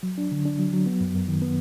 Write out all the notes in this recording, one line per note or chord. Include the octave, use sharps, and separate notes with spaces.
F#3
D4
D3
D4
F#3
F#3
B3
F#2
F#2
D#3
B3